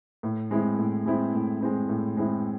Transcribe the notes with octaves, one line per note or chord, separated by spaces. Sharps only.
A2
G#3 C4 E4
A2
G#3 C4 E4
A2
G#3 C4 E4
A2
G#3 C4 E4